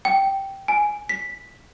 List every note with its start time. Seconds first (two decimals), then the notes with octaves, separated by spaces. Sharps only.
0.05 G5
0.68 G#5
1.09 B6